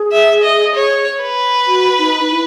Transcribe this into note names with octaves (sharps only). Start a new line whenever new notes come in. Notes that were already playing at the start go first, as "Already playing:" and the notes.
Already playing: G#4
E5
D#5
C#5
B4
F#4
D#4
E4